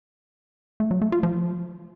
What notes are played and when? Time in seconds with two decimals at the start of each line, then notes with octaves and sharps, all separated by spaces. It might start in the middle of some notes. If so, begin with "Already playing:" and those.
0.80 A3
0.91 F#3
1.02 A3
1.12 F4
1.23 F3